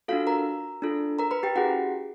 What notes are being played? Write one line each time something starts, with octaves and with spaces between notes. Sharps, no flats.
D4 F4 F#4 A4 F5
A#4 A#5
D4 F4 A4
A#4 A#5
B4 B5
G4 G5
C#4 E4 F#4 G#4 F#5